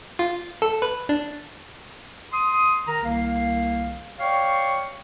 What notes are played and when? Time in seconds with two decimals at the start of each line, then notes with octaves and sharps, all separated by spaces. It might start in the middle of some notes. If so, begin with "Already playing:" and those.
0.19 F4
0.62 A4
0.82 B4
1.09 D4
2.33 C6 D#6
2.87 D#3 A#4 A#5
3.03 C2 D#3 A#3 F5
4.20 C#5 D5 F5 G5 C#6